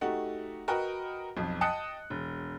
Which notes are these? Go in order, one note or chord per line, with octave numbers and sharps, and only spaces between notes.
A3 D#4 F#4 G4 F#5
F#4 A#4 B4 D#5 F#5 G5
B1 F2
D#5 G5 A5 D#6 F#6 C#7
E1